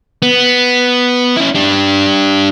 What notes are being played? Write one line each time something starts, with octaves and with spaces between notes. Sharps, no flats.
B3
C#4 E4
D4 G4